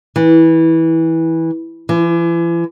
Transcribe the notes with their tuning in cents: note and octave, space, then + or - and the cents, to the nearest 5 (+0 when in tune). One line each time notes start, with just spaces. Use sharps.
E3 -15
E3 +40